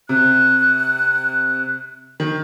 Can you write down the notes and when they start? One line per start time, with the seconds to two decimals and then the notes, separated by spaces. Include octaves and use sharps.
0.09 C3 F#6
2.20 D#3